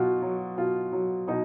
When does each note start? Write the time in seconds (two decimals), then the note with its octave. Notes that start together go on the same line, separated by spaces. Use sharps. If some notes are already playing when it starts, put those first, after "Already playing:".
Already playing: B2 F#3 F4 F#4
0.22 F#3
0.58 B2 F4
0.92 F#3
1.28 B2 D#4